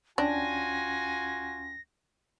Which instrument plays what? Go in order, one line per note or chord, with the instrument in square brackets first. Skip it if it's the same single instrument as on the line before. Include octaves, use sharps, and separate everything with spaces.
[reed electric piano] D2 C#4 G5 [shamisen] D4 [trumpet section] F4 F#4 G#5 [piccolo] A#6